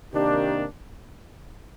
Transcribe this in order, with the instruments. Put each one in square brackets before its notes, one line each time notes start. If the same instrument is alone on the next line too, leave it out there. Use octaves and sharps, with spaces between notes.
[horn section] C3 D#3 A#3 D4 [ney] G4